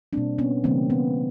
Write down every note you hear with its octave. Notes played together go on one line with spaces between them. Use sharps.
B2 G3 A#3 C4 D4
B3 C#4
C#3 E3 G3 A#3 C4
B3